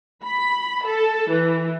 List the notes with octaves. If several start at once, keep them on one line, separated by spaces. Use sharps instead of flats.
B5
A4
E3